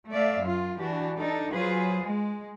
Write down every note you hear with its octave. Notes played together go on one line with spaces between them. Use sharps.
A3 D5 E5 F5
F#2 F4
E3 D4 F#4 G4
D4 D#4 A4
F#3 F4 G#4 B4 C5
G#3